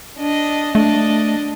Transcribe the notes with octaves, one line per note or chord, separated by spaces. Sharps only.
D4 D#5
A3 D4 D#5